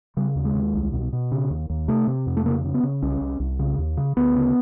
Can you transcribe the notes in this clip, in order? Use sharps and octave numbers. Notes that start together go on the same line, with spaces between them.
C#3 G3
D#2
G#3
D#2
C2
B2
B2
C#3
D#2
D#2
C3 A3
C3
F2
A3
C#3 A#3
C#3
B3
C#3
C2 C#4
C2
C2
C#3
D#2
C#3
D2 B3
C#3